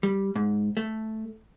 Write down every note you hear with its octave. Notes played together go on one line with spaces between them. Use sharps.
G3
G#2
A3